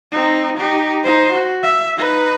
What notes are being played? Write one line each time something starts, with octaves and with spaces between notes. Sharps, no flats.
C4 D#4
D#4 G4
D#4 C5
F#4
E5
D#4 B4